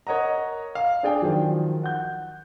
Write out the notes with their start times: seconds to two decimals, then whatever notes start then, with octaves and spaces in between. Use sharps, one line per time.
0.07 A#4 C#5 D#5 F#5 A#5
0.75 F5
1.03 D4 G#4 D5 G5
1.22 D#3 F3 F#3
1.83 F#5 G6